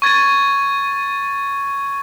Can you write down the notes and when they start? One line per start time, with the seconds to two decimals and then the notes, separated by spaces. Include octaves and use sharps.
0.02 C#6 G#6 A6 D#7